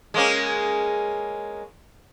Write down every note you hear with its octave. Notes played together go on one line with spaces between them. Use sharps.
G#3 A#3 C#4